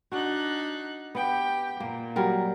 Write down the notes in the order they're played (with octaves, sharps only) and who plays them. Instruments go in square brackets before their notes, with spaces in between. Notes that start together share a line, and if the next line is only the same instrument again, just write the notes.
[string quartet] D4 D#4 F#6 [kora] F#4
[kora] B3 [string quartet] G4 G5
[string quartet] A#2 [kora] A#3
[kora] F#3 G3 A#4